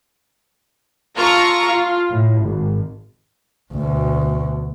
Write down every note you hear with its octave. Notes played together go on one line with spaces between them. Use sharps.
F4 A4 A#5 C#6
F4
A2
G#1
D2 B2